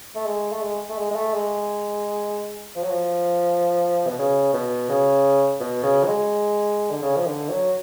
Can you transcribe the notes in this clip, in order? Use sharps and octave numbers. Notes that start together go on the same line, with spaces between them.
A3
G#3
A3
G#3
A3
G#3
G#3
A3
G#3
F3
F#3
F3
B2
C#3
B2
C#3
B2
C#3
F#3
G#3
D3
C#3
F3
D3
F#3